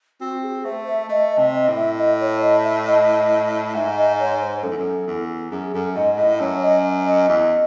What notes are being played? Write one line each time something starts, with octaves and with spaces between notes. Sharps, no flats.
C4 F#4
G#4
A3 C5
E5
A3 D#5
D#5
C3
D#5
A2
E5
D#5
C#5
D#5
E5
D#5
G#2 E5
D#5
C#5
C5
F#2 A4
E2
F#2
E2
F#2 G#4
F#2 A4
G#2 D#5
A2 D#5
F#2 C#5
D#5
D#5
E2